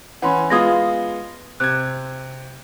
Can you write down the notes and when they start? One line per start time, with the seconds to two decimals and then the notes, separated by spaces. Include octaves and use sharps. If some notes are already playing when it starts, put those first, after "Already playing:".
0.22 E3 C#4 F#5 B5 C6
0.50 G#3 B3 F4 D#6 G#6 A#6
1.60 C3 F#6 G#6